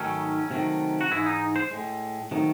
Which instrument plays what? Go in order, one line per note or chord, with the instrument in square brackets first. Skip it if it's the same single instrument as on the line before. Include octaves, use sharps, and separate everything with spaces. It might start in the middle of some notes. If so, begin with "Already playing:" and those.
Already playing: [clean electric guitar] G#2 D#3 F#3 A3 C#4
C3 D#3 F#3 A3
F#4
G#2 E3 G#3 E4
D#4
C5
A2 G#3
C3 D#3 F#3 A3